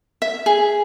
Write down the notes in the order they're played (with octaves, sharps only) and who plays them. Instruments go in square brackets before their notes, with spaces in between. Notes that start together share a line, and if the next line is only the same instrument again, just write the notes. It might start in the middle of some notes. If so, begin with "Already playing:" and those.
[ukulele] E5
G#4